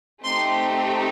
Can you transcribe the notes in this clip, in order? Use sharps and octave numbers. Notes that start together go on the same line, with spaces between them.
A3 C4 D#4 G4 C6